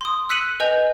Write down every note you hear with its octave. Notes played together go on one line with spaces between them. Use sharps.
C6 D#6
E6 F#6 B6 C#7 D#7 F#7
B4 D#5 G#5 G6 F7